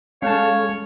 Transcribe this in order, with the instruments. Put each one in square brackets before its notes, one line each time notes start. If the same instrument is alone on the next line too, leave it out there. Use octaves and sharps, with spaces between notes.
[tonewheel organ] G#3 A4 [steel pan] C#4 A5 [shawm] C#5 [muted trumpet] F5